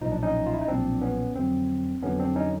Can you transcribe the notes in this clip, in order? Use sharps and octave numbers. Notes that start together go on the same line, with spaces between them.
B1 A#2 F3 D#4
D4
C#4 D#4
F4
E4
D#4
B1 A#2 F3 C4 D4
B3 C#4
F2 D3 F#3 C4
F2 D3 F#3 B3 C#4
C4 D4
C#4 D#4